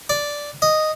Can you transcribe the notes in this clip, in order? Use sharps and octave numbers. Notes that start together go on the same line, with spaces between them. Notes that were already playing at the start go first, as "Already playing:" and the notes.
D5
D#5